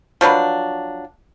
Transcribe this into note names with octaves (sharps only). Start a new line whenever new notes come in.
F3 F#3 D4 B4